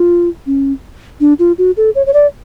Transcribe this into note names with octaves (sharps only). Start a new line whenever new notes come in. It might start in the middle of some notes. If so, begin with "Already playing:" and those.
Already playing: F4
C#4
D4
F4
F#4
A4
C#5
C#5
D5